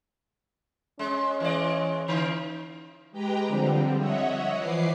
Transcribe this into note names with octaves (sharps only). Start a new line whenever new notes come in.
G#3 C#4
E3 G#3 D5
D3 E3
G#3 G4 B4 G5 A#5
D3 F3 G3 C4
C#5 D#5 E5 F#5
E3 F3 B4 D6 C7